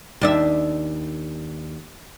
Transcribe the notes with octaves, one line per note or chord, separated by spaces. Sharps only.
D#2 D4 E5